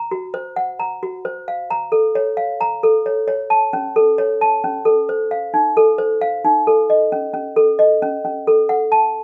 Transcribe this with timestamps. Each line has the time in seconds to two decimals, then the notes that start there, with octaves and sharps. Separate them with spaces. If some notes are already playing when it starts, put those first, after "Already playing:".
Already playing: A#5
0.11 F#4
0.34 C5
0.56 F#5
0.79 A#5
1.03 F#4
1.25 C5
1.48 F5
1.70 A#5
1.92 A4
2.15 C#5
2.37 F5
2.61 A#5
2.83 A4
3.06 C#5
3.28 C#5
3.50 A5
3.73 C#4
3.96 A4
4.18 C#5
4.41 A5
4.64 C#4
4.85 A4
5.09 C5
5.31 F5
5.54 D#4
5.77 A4
5.98 C5
6.21 F5
6.45 D#4
6.67 A4
6.90 D#5
7.12 C#4
7.34 C#4
7.56 A4
7.79 D#5
8.02 C#4
8.25 C#4
8.47 A4
8.69 F#5
8.92 A5